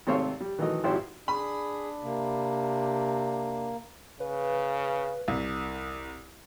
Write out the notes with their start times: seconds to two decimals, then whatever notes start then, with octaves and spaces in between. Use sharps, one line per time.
0.07 G#1 C3 A3 C5 C#5 F5
0.40 G3
0.59 D#3 E3 F#3 A3 D#5
0.84 G#1 F3 E4 F#4 G4 C5
1.28 D4 G#4 B5
2.02 C3 A#3
4.20 C#3 B4
5.28 C2